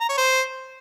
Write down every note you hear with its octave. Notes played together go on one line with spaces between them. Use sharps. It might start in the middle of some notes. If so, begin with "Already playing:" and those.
A#5
C#5
C5